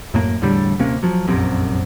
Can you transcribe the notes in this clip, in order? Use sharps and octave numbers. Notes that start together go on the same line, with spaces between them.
F#2 A2 A#3
E2 A2 D3 G3
D#1 C3 A#3 C#4
F3 F#3
F1 A#1 F#2 C3